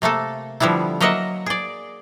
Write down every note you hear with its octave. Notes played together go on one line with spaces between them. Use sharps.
C3 A3 A#3 A4
D3 F3 G3 B3 E4
F#3 A#3 A#4 D#5 E5 F#5
G#4 D5